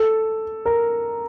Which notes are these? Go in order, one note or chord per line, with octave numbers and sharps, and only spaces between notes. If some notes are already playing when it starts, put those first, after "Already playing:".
Already playing: A4
A#4